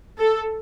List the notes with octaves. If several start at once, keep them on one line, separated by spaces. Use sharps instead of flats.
A4